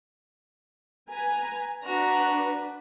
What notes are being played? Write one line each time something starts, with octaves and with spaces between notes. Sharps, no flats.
B4 G#5 A#5
D4 F#4 B4 A#5